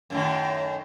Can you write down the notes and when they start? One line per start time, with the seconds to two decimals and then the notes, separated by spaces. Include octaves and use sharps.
0.10 F#2 A2 D#3